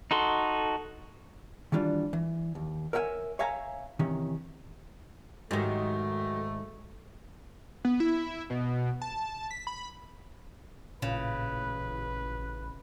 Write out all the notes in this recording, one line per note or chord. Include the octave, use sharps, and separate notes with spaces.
D#4 F#4 A4 C6
D#3 E3 G3 D4 F4
E3
D#2
A#4 C#5 E5 F#5 G#5
C#5 E5 F5 G#5 A#5
C3 D#3 E3 C#4
G#2 D#3 F#3 A3 D#4 G4
B3
E4
B2
A5
B6
B5
A1 A#2 C#3 B4